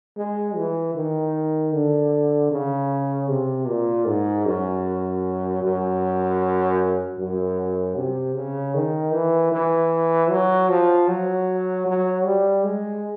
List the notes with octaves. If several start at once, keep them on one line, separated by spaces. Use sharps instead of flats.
G#3
E3
D#3
D3
C#3
C3
A#2
G#2
F#2
F#2
F#2
C3
C#3
D#3
E3
E3
F#3
F3
F#3
F#3
G3
G#3